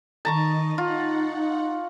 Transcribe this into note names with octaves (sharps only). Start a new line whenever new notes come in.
D#3 D#5 A5 A#5 C#6
D#4 F4 F#5